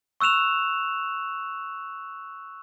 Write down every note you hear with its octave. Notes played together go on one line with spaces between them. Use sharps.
C#6 E6 F#6 E7 F7